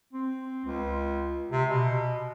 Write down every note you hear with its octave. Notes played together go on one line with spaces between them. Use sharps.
C4
C#2
C3
B2